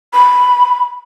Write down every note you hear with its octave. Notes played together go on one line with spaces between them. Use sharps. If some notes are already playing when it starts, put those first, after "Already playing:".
B5